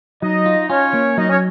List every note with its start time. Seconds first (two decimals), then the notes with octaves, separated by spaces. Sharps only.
0.22 F#3 D#4 D#5
0.46 F4
0.70 C#4 F4 C#5
0.94 A#3
1.17 F#3 D#4 D#5
1.30 C#4 C#5